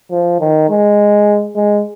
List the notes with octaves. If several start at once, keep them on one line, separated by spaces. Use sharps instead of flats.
F3
D#3
G#3
G#3